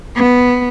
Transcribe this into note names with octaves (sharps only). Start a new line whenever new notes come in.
B3